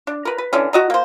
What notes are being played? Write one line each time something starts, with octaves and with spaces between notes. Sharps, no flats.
D4
A#4 B4
B4
D3 E3 C#4
F#4 D#5 A#5
A#3 C5